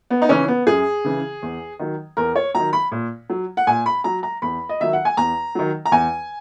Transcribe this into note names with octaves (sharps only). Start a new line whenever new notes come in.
B3
D#4
C#3 E3 C#4
B3
F#2 G#4
C#3 E3
E2
D#3 F#3
E2 A#4
C#5
D#3 F#3 A#5
B5
A#2
F#3
F#5
A#2 G#5
B5
F#3 A#5
A#5
E2 B5
D#5
D#3 F#3 E5
F#5
G#5
E2 A#5
D#3 F#3
A#5
E2 G#5